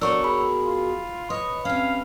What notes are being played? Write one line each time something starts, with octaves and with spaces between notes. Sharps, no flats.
B2 D4 F#4 A#4 C#5 C#6 E6
G#4 B5
F4
B4 C#5 D#5
C3 C#4 F5